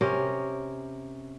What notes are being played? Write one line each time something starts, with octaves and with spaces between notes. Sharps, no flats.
C3 C#4 A#4